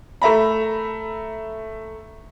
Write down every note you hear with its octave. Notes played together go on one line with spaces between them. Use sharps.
A3 E5 A#5 B5